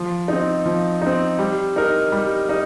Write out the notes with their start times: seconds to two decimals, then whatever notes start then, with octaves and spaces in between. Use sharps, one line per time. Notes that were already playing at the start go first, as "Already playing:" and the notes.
Already playing: F3
0.28 C4 D#4
0.66 F3
1.02 C4 D#4
1.39 G3
1.76 D#4 A#4
2.12 G3
2.49 D#4